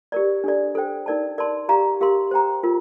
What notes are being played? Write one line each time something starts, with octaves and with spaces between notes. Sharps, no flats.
G4 A#4 D5
D4 A4 D5
A4 C5 G5
D#4 A#4 D5 A5
A#4 D5 A5 C6
G4 D5 F5 A#5
G4 A#4 F5 C6
C5 G5 A#5
F4 A#4